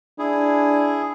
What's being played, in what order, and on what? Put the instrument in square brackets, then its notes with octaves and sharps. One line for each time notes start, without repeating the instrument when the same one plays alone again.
[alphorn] D4 [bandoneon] E4 G#4